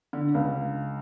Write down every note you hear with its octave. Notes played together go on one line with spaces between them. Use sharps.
D3
C#2